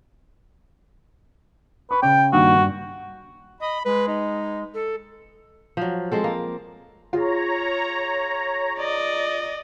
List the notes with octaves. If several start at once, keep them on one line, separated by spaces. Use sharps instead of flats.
B4 C#6
C#3 G5
G2 D#3 A#3 F#4
G2
D#5 B5
G#3 B4
D#4
A4
F3 F#3
G#3 C4 A4
A#3
F4 G#4 C#5 A#5
D5 D#5